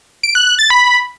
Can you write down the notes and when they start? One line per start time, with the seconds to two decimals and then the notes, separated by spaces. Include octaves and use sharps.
0.23 D7
0.35 F#6
0.47 F#6
0.59 A6
0.70 B5